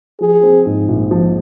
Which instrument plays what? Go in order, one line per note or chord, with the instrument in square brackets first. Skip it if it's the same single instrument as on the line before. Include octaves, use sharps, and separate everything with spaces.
[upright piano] F3 [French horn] G#4
[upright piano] C4
G#2
A#1
F3